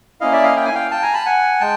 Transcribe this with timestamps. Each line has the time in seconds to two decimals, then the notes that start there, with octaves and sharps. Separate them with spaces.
0.21 A#3 C#4 E4 D#5 F5
0.32 D5 E5
0.44 D#5 F5
0.56 G5
0.65 G#5
0.75 F5 G5
0.91 G5 A5
1.02 G#5 A#5
1.14 A5 B5
1.26 F#5 G#5
1.60 G#3 G5 A5